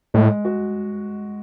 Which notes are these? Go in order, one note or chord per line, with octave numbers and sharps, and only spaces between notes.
A2 G#3
F#4